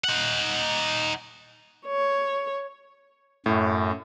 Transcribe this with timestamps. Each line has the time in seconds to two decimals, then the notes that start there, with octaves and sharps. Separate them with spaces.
0.04 D#4 F#5
1.86 C#5
3.46 F#2 A2